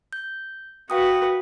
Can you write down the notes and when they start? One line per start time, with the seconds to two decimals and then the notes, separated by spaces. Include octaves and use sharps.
0.13 G6
0.90 F#4 B4 F5 G5 D#6